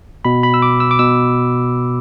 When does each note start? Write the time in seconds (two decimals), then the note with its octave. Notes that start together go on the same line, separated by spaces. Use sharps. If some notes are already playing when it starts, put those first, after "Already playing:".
0.25 B2 B5
0.43 B5
0.54 E6
0.62 D6
0.80 E6
0.91 D6
0.99 B2 E6